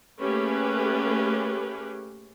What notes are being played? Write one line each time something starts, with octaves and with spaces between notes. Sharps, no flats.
A3 A#3 C#4 G4 G#4 B4